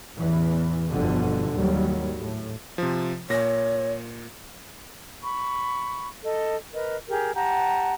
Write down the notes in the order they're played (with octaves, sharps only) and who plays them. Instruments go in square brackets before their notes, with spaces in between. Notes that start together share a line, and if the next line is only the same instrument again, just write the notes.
[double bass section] A1 E2 E3
G1 F2 B2 D3
D#2 G#2 F#3 G3
A2
[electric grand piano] C3 F3
[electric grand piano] A#2 A#6 [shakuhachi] C#5
[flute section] B5 C#6
A4 D#5
A#4 B4 D#5
G4 G#4 A#4
G4 F#5 A5 A#5